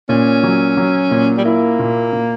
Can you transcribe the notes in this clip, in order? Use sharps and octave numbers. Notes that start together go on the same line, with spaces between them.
A#2 C#4
F#3
F#3
A#2
G3
A#3 E4
A#2
A#2